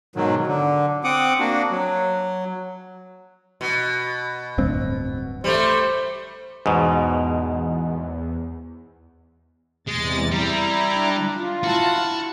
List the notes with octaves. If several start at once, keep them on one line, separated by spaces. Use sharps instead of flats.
G#2 B2 D#3 F#3
D3
C4 F#5 D6 D#6
A#3 D4 F#4
F#3
B2
D1 G2 C4
G3 A3 C5
E2 G#2 B2
E2 C3 G#3 A6
G3 E4 A#5
D4
F4
E4 F#4 A5